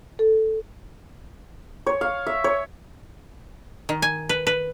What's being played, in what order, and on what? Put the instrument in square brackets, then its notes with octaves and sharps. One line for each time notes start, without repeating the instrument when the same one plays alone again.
[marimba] A4
[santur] C#5
F5
E5
C#5
[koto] D#3
G#5
B4
B4